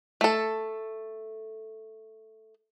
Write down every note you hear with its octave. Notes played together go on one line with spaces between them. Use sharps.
A3 A4